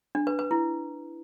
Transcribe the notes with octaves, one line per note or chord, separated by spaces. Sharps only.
D4
B4
B4
E4